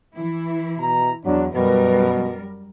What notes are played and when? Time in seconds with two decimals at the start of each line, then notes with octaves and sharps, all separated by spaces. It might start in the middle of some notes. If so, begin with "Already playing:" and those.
0.15 E3 E4
0.78 B2 A#5
1.25 E2 F#3 D4
1.54 F#2 B2 G3 A#4 B4